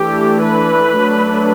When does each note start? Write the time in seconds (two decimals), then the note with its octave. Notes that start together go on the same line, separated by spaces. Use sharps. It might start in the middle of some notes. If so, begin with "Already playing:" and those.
Already playing: E3 A3 D4 G4
0.44 B4
0.95 F#3 A3 D4